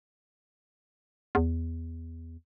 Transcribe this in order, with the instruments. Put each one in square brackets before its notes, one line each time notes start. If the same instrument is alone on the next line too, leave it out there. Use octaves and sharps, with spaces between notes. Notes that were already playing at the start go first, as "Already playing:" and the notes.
[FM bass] E2